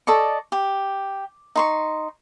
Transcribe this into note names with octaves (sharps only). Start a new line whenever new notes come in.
A4 D5 D#5 C#6
G4
D#4 C6 C#6